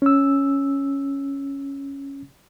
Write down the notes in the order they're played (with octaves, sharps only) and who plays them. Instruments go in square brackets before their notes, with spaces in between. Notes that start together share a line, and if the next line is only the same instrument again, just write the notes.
[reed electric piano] C#4 E6